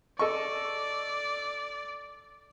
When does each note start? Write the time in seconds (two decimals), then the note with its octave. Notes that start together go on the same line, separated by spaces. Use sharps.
0.19 A4 D5 D#5 C#6